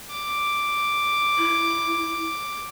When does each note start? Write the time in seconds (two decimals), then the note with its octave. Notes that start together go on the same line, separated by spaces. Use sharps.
0.10 D6
1.38 E4